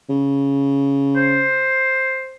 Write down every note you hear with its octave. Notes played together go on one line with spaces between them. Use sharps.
C#3
C5